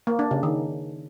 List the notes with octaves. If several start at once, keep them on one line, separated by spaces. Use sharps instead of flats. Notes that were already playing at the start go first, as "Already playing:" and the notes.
A#3
D4
C#3
D#3